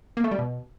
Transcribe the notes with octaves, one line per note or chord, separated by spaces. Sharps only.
A#3
A3
G3
B2